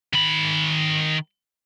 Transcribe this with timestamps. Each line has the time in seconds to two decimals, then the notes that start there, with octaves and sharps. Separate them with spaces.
0.13 D#3 B5